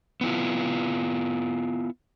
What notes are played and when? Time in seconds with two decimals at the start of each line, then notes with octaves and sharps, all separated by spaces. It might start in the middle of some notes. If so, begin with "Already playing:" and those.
0.21 B3 E4 F4